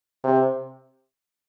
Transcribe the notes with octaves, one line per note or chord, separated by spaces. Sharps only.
C3